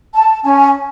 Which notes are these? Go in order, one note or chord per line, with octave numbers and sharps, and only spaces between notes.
A5
C#4 G#5